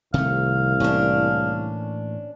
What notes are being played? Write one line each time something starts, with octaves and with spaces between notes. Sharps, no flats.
C2 C3 D#3 A3 F5
A2 E3 A#3 C#4 D4